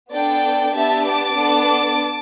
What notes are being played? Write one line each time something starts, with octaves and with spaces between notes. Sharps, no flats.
B3 D4 A4 D5 G5
B3 D4 G4 E5 A5
A5 D6
B3 D4 A4